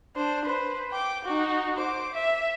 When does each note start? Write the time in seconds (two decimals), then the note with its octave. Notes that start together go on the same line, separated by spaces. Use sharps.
0.16 D4 C5
0.45 B4 C5
0.91 G5 D6
1.24 D#4 F#4
1.76 C5 D6
2.13 E5